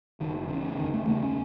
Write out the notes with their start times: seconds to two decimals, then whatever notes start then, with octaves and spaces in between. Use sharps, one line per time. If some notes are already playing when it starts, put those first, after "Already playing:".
0.20 F#1 D#3
0.48 E2 D3
0.53 C#3
0.78 F#1 D#3
0.94 A3
1.07 E2 C#3 A#3
1.23 C#4